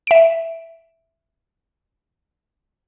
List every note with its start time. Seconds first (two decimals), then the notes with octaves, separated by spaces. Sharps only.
0.07 E5 D7